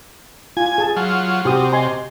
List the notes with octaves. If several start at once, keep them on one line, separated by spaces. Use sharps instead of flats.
F4 G#5
G#4 A5
F#3 F4
C3 F#4 G4 D#6
D#5 G#5 C6